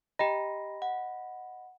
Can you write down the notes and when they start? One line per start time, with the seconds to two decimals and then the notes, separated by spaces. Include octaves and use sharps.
0.19 G4 D#5 G5 A#5 B5 A#6
0.82 F#5